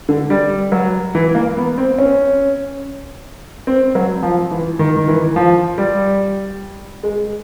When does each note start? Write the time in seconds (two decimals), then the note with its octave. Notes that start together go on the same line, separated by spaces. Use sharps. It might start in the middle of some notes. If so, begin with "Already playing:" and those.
0.09 D3
0.30 G3
0.72 F#3
1.15 E3
1.35 A#3
1.57 B3
1.78 C4
1.99 C#4
3.67 C4
3.95 F#3
4.23 F3
4.51 E3
4.79 D#3
4.96 D#3
5.08 E3
5.36 F3
5.78 G3
7.03 G#3